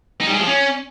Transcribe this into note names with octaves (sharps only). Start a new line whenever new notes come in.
D#4
G3
G#3
F3
C#4